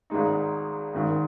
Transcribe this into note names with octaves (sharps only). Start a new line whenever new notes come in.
G#1 G#2 G#3 D#4
G#1 G#2 D#3